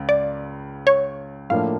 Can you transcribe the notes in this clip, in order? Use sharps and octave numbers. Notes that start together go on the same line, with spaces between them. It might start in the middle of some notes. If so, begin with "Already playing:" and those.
Already playing: C#2 C#3
D5
C#5
A2 F3 A#3 D4 F5